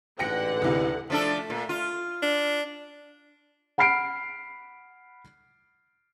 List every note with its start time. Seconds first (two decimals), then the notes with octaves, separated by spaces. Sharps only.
0.19 A1 G#2 D3 B4 F#5 G5 A#6 C#7
0.62 D2 C3 E4
1.10 F3 A3 D4 A4
1.50 A#2
1.69 F4
2.23 D4
3.78 F#5 B5 F6 C7 D7